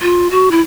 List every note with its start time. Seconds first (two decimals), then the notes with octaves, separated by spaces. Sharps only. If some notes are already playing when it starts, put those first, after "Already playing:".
0.02 F4
0.31 F#4
0.51 E4